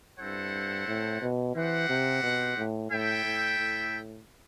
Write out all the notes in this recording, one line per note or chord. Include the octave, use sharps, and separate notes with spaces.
G2 C4 E4 A4 C5 F#5
A2
B2
E3 C4 G4 C5 F#5
C3
B2
A2
A2 E4 A4 E5 G5
A2
A2